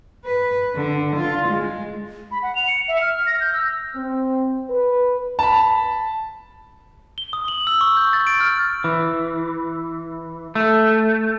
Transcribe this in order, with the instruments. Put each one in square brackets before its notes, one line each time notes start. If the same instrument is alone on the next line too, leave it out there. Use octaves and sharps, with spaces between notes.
[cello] B4
D3
F4
G#3
[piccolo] B5
F#5
F7
C#7
E5
F6
A#6
G6
E6
[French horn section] C4
B4
[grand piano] A5 B5
[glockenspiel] G7
D#6
F#7
E6
C#6
G6
A6
D7
F6
[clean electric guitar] E3
A3